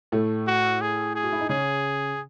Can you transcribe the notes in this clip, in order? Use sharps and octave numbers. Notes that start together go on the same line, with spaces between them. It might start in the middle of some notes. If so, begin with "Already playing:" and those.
A2 A3
F#4
G#4
G#4
F#4
E4
D#4
C#3 C#4 G#4